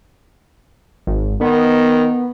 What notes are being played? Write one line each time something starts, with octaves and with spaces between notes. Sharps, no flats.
G#1
D#3 B3